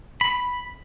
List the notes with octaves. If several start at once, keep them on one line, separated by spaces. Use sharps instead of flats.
B5